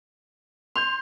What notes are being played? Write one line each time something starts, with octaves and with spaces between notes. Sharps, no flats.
C6 G6 F7